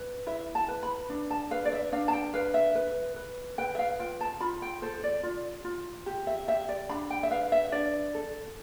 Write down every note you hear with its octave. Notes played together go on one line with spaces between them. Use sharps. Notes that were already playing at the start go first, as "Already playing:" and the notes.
Already playing: B4
E4 E5
A5
B4
B5
D4
A5
B4 F5
D5
E5
D4 F5
A5
G5
B4 F5
E5
B4
B4
B4 G5
E5
F5
F4 G5
A5
F4 B5
G5
A4 C5
D5
F4
F4
G4
E5
G4 E5
D5
D4 B5
G5
E5
B4 F5
E5
D4 D5
A4